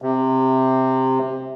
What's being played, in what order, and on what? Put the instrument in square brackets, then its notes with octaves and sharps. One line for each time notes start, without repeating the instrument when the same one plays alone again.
[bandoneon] C3